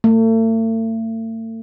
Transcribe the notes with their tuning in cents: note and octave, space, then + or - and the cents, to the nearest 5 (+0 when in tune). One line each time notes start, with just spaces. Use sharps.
A3 +40